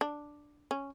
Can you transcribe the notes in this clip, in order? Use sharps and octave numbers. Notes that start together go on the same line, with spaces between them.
D4
C#4